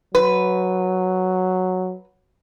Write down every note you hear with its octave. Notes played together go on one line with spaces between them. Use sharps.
F#3 B4